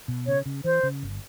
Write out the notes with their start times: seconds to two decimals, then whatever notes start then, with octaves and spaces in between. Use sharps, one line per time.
0.08 B2
0.27 C#3 C#5
0.46 C#3
0.64 E3 C5
0.83 C#3
1.03 G1